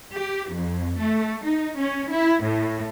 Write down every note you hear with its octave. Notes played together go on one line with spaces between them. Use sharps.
G4
F2
A3
D#4
C#4
E4
A2